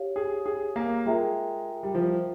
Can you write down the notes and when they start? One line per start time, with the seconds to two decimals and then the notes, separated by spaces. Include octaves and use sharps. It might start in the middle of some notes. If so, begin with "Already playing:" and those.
Already playing: G4 C#5 F5
0.16 G#4
0.46 G#4
0.76 A#3
1.05 G#3 F4 A#4 E5 G5 A#5
1.83 G3
1.95 F3